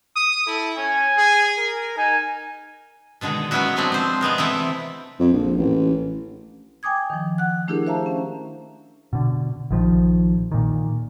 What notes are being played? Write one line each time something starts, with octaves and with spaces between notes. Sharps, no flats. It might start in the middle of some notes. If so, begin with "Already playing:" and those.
D#6
E4 A4
C#4 G#5
G#4
A#4
D#4 G#5
B2 D3 D#3 G#3
F#3 G#3 B3 C#4 E4 F#4
F3 F#3 G#3 A3 C4 D4
C4 C5
C3 G#3 B3 A#4
E3 A3 C4 E4
F2
A#1
A1
G5 G#5 D6 D#6 G#6
D#3 F3
F#5 F#6
A3 D4 E4 G4 G#4 A#4
C5 E5 F5 A5 A#5
C#4
B2 D3
A#1 D#3 F3
A#2 D#3